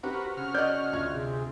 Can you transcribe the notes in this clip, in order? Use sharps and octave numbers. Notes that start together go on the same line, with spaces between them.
C4 F#4 G4 A#4 B4 F#5
C#3 F#4 F6
D5 D#5 F#6 G6
D2 F4 G#6
C3 G#4